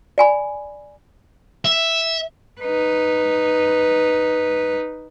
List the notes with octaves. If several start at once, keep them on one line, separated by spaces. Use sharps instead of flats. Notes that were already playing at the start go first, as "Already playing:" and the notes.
D5 G#5 B5
E5
D#4 B4